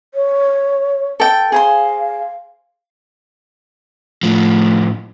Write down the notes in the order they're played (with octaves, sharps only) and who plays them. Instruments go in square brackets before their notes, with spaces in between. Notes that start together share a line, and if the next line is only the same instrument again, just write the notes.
[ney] C#5
[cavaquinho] A4 G5
[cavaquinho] G#4 C5 C6 [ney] F5
[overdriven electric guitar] A2 F3 [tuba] A3